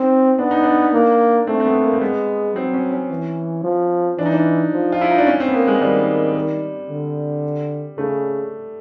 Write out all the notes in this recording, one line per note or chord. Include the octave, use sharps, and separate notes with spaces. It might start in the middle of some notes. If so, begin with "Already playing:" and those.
Already playing: C4 D#4
B3 D4
D#4
D4
A#3
A3 C4
C4
B3
A#3
C4
G#3 B3
F#3 C4
C#4
C#4
E3
F3
E3 D4
D#4
D4
F3
F4
E4
D#4
D4
C#4
C4
B3
A#3
G#3
D#3 G3
D3
C#3 A3